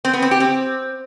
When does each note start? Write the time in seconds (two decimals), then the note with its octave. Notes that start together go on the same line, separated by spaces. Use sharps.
0.05 C4
0.13 B3
0.22 C4
0.31 G4
0.40 C4